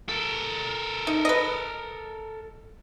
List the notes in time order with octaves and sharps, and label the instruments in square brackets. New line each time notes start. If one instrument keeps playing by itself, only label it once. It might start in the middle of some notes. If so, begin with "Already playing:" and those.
[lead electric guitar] A4 A#4
[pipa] D#4
B4 D#5